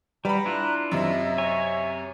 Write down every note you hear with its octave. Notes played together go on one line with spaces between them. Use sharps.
G3 B4 F#5 A#5 B5
D4 E4 F4 F#6
F#2 C3 D#5 E5
C#5 G#5